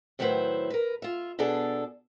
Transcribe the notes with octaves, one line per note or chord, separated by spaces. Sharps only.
A2 D#3 F#3 E4 B4 C5
A#4 B4
F4 E5
B2 B3 D4 G#4 A4